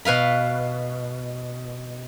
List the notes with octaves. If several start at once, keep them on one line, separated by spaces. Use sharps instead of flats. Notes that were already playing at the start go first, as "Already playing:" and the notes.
B2 B4 F5 B5